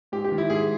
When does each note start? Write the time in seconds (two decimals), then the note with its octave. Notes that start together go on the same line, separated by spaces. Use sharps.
0.12 G#2 G4
0.24 G4
0.32 D#3
0.38 E4
0.50 G#2 G#4